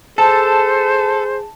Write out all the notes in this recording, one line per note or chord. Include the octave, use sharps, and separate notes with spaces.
G#4 A4 C5 A5